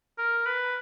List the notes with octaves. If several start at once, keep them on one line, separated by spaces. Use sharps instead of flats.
A#4
B4